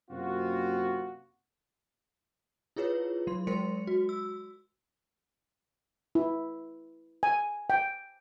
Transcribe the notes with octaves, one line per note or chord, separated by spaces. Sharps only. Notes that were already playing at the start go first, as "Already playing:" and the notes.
F#2 C3 A#3 C4 F4 F#4
E4 F4 G#4 B4 C#5
F#3 C6
G#3 A#4 C5 C6 C#7
F#4
E6
E4
G#5
G5